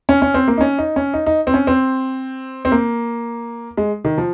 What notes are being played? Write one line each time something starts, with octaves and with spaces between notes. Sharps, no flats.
C#4
C#4
C4
A#3
D#4
C#4
D#4
C#4
D#4
D#4
C4
C#4
C4
C4
A#3
G#3
D#3
F3